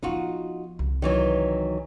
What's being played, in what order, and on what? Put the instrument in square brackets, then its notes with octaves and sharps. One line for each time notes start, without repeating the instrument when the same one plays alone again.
[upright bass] F3 B3 [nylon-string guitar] D#4 F4 F#4
[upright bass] C2
[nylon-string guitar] D#3 E3 F#3